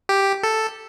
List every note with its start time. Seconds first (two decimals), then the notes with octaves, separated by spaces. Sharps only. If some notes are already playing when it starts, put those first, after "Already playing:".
0.09 G4
0.43 A4